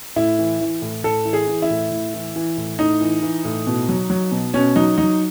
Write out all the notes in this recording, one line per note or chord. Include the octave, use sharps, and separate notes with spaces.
A2 E4
E3
E3
A2
A2 A4
E3
G#4
E3
E4
A2
A2
E3
E3
A2
A2 D#4
E3
E3
A2
B2
F#3
F#3
B2
B2 C#4
F#3 D#4
F#3 D#4